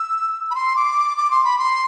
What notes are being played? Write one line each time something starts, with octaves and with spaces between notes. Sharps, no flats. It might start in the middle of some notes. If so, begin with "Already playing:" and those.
Already playing: E6
B5
C6
D6
D6
C6
B5
C6